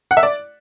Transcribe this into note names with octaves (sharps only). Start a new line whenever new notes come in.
F#5
E5
D5